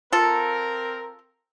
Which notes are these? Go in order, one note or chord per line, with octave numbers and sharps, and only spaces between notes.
C4 F4 A4 A#4